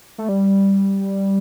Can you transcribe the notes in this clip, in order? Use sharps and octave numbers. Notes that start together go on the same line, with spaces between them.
A3
G3